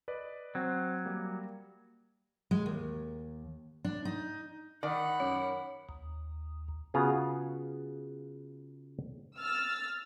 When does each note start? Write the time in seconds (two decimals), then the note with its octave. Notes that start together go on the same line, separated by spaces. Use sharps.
0.08 B4 D5 D#5
0.55 F#3 C4 F#4 C5
1.05 G3 A#3
2.51 G#3
2.66 D#2
3.85 D4
4.05 D#4
4.83 D#3 D5 F#5 B5
5.20 F#2 C#5
5.89 D#2
6.94 C#3 B3 F4 F#4 G#4 A#5
9.36 E6 F6 A6